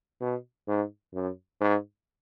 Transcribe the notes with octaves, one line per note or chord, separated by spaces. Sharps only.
B2
G#2
F#2
G#2